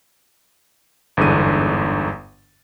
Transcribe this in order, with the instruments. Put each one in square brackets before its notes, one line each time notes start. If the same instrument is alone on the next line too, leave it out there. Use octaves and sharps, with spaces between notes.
[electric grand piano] G1 E2 G#2 D3 D#7